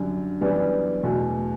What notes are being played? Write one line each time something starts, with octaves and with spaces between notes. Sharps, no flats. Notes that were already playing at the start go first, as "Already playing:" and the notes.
Already playing: F#2 D3 G3
F#2 E3 G3 B3 D4
E2 B2 A3